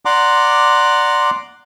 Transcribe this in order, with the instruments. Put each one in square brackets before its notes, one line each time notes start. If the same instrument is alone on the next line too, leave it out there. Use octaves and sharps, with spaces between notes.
[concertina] D5 F#5 A#5 C6 D6